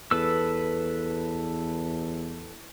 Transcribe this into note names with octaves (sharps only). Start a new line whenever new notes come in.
E2 A4 B4 E6